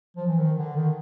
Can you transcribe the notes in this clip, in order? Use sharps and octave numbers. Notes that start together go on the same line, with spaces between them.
F3
E3
D#3
D3
D#3